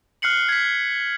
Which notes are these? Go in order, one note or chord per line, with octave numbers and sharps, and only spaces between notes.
F6 F#6 C7 C#7 F#7
G#6 B6